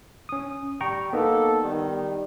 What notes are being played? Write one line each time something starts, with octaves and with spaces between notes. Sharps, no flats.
C#4 D#6
G3 G5 A#5 C#6
A#3 B3 D#4 A4
D#3 G3